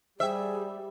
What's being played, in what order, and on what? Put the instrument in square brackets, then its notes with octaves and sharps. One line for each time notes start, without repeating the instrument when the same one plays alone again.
[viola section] G3 [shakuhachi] G#4 [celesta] C5 G5 [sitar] E5